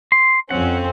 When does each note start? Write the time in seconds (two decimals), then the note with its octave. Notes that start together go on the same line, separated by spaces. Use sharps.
0.12 C6
0.51 F2 C4 C#4 F#5